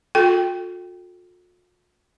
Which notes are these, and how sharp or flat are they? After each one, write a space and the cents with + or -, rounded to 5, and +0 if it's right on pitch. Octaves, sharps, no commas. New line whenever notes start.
F4 +45 A4 +0 G5 +0